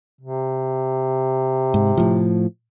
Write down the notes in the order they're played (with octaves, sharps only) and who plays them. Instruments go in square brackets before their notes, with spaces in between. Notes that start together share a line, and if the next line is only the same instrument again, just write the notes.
[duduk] C3
[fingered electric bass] G#2
A2 F3